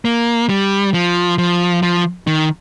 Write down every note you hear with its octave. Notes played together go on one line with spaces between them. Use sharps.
A#3
G3
F3
F3
F3
D#3